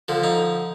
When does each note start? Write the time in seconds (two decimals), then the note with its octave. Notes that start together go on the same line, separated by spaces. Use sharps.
0.08 D3 F3
0.23 D#4